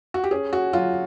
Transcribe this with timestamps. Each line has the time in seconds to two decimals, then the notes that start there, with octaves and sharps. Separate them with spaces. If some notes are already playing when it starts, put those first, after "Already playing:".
0.14 F#4
0.24 G4
0.31 C#4 G#4
0.53 F#4
0.73 F#3 F4